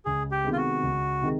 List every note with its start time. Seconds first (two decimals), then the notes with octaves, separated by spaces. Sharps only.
0.05 C#2 G#4
0.31 G4
0.44 C3 D#3 G#3 B3
0.52 F4
0.57 F#4
0.83 C#2
1.22 C3 D#3 G#3